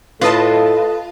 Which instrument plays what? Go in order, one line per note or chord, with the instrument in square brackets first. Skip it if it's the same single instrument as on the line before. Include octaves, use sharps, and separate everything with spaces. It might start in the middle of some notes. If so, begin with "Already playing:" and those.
[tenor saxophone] A2 [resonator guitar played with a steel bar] F4 [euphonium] A4 [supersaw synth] B4 D#5 A5